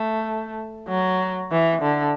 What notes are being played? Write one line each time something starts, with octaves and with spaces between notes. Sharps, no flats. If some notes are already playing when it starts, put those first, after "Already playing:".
Already playing: A3
F#3
E3
D3